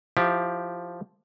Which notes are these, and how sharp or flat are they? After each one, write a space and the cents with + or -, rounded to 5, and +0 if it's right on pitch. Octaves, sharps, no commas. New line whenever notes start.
F3 +0 E4 +20 G4 +0